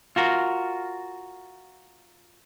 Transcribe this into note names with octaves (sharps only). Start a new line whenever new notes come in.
F4 F#4 A#4